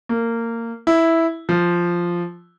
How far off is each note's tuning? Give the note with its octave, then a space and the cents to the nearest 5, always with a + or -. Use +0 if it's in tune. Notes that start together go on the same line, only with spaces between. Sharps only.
A#3 -20
E4 -5
F3 -5